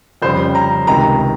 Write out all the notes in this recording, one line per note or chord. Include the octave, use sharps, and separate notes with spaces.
F2 C#3 G3 C5
A#5
C#2 C3 D#3 A#5